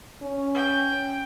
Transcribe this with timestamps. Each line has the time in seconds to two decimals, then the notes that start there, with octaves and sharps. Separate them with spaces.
0.22 C#4
0.54 G5